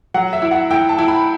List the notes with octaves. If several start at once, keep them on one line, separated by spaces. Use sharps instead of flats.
F#3 F#5
E5
E4
F#5
E4 G5
A5
E4
B5